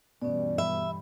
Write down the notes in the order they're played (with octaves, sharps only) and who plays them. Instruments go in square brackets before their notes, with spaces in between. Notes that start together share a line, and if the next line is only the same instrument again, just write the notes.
[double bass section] G2 E3 G3 [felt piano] B2 [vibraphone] C#4 D5
[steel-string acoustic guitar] E5 [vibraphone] B5